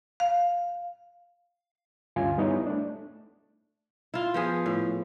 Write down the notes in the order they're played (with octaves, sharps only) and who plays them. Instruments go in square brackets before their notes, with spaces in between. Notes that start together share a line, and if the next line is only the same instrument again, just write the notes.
[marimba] F5
[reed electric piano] D2 G2 C#4 F4 F5 G#5
G3 B3 D#4 E4 C#5
A3 D4
[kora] E4 F4
F3 B3 G#4
A2